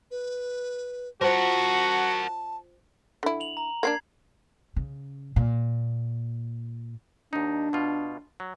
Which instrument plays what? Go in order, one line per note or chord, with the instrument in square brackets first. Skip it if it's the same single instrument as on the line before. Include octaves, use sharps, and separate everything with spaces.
[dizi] B4
[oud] F4 C5 [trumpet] F#4 [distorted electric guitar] A#4 F#5 [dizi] A5
[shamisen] D3 E4
[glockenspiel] F7 F#7
A#5
[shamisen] A#3 C4 D4 [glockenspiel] G#6 C7
[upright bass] C#3
A#2
[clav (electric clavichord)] D#2 D#4 [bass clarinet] D4
[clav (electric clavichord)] B2 F4
F#3